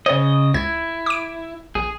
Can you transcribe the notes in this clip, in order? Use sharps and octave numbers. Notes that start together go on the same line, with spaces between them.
C#3 C5 C#5 D#5
C#2 E4 G#6
D6 D7
A#1 G#4